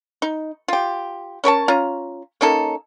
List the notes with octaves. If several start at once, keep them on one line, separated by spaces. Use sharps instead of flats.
D#4
F4 G4
C#4 A#4 C#5 A5
C#4 F4 A#5
A#3 C#4 D#4 A4